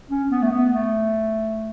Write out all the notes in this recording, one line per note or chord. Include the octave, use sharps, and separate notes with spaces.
C#4
B3
A3
B3
A3